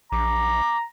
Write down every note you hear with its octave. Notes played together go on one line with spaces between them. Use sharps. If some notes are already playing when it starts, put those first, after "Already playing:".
A#1 A#5 D6